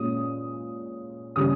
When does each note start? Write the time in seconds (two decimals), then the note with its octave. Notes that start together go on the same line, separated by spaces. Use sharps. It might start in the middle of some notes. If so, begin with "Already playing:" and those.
Already playing: A#2 G#3 C#4 D#6
1.36 C#3 G3 C#4 D#6